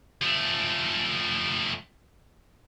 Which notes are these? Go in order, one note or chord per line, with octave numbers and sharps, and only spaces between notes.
F3 A3